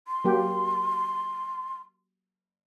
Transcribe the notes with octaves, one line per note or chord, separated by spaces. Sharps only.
C6
F#3 A#3 G4